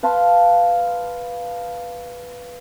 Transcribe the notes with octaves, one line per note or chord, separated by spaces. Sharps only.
B4 F5 A5 C6